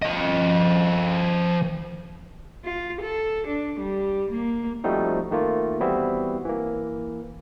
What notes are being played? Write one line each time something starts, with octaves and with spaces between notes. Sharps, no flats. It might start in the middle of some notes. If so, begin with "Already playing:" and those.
F3 D#5
F4
A4
D4
G3
A#3
F3 G3 A3 C4 D#4 F#4
D#3 A3 A#3 F4
E3 G3 B3 C4 E4 F#4
E3 A#3